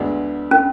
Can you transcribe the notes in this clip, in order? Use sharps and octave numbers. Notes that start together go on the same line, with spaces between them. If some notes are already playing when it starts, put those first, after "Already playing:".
Already playing: D2 D3 G#3 B3 D4
C#4